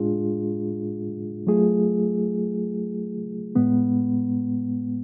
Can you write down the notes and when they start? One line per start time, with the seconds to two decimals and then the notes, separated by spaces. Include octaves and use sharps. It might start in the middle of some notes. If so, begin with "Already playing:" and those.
Already playing: A2 G#3 D4 F4 G#4
1.47 F#3 A3 F4 G#4
3.55 A2 G#3 B3